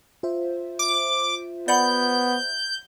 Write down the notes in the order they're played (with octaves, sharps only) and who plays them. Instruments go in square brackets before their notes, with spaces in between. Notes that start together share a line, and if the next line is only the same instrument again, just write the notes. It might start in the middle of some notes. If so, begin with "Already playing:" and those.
[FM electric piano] F4 C5 E5
[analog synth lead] D6
[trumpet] B3 [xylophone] D5 F#5 B5 [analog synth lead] G6